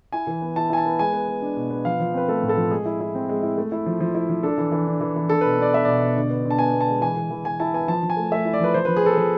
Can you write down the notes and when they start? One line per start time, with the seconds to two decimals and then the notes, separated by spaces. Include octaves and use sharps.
0.12 E4 G#5
0.27 E3
0.42 B3
0.56 E4 A5
0.70 E4 G#5
0.77 A5
0.85 B3
0.99 G#3 G#5
1.13 B3
1.28 B3
1.42 D4
1.56 B2
1.70 B3
1.85 F3 F5
2.00 F3
2.14 C4 B4
2.28 A3 A4
2.43 A2
2.49 A4
2.57 F3
2.71 G#3 G#4
2.86 E4
3.01 E4
3.15 C4
3.29 G#3
3.43 E4
3.57 A3
3.72 E4
3.86 F3
4.00 F3
4.15 E4
4.29 F3
4.43 D4 A4
4.58 E3
4.72 E3
4.87 D4
5.01 E3
5.16 E3
5.29 D4 A4
5.41 B2 B4
5.58 D4 D5
5.72 B3 E5
5.85 B2 D5
6.02 B2
6.16 D3
6.30 B3
6.45 D3
6.51 A5
6.59 B3 G#5
6.74 B3
6.81 A5
6.88 G#3
7.02 E3 G#5
7.16 E3
7.31 E3
7.45 E3 G#5
7.60 E4 A5
7.74 B3 G#5
7.88 F3 A5
8.03 F3
8.10 G#5
8.17 A3
8.32 A3 E5
8.45 E4
8.54 D5
8.60 F3 B4
8.74 F3 C5
8.85 F3 B4
8.96 G#4
9.04 B3 A4
9.17 F3 B4